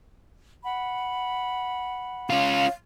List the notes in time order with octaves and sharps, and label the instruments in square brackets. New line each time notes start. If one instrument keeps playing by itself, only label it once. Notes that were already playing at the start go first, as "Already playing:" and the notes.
[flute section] F#5 B5
[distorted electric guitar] C#4 F4 [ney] F5